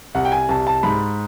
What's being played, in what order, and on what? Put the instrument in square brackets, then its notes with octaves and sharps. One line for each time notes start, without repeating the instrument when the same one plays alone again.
[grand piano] C2 F#5
G5
G#5
C2 A5
A5
G#2 B5